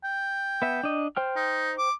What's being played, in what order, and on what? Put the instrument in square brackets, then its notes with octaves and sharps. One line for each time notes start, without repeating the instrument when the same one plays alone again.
[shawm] G5
[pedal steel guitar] B3 E5
D4 D#5
C5 G5 F6
[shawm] D#4
D6